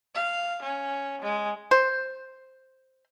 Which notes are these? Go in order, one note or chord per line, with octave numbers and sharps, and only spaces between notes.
F5
C#4
G#3
C5